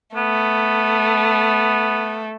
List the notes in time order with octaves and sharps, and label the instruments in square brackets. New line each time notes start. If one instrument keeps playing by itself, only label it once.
[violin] A3 [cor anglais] B3